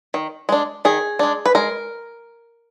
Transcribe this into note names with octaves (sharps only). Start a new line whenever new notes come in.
D#3
G#3 D4
D#3 G#4
G#3 D4
B4
G#3 A#4